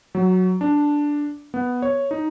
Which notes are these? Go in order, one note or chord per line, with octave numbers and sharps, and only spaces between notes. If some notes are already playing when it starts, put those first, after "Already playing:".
F#3
D4
B3
C#5
D#4